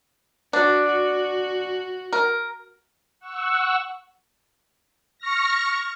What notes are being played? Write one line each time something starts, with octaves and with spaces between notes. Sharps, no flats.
D4 F#4
F#4
A#4
F#5 C#6 E6
C#6 F6 A#6